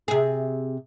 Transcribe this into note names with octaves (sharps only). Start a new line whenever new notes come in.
C3 G#4